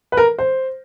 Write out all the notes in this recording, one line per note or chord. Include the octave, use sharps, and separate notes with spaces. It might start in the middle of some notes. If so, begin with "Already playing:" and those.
B4
A#4
C5